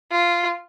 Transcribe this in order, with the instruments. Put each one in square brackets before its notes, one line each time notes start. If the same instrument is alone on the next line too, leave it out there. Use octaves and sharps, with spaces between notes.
[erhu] F4